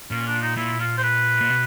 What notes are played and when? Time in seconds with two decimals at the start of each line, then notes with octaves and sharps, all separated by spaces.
0.10 A#2 C#4
0.26 D4
0.41 D#4
0.56 A#2 E4
0.80 F4
0.98 C5
1.03 B4
1.40 A#2
1.50 B2